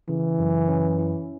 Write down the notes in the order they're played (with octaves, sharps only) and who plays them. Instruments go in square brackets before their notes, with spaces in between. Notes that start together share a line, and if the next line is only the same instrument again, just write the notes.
[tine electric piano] C#3 [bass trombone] E3
[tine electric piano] F#2
C#4
E4